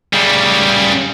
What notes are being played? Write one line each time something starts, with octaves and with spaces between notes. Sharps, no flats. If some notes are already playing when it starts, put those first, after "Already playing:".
C#3 G3